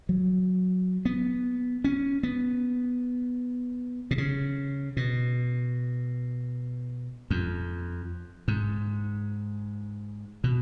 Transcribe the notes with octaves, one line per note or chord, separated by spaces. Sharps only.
F#3
B3
C#4
B3
B2
C#3
B2
F2
G#2
B2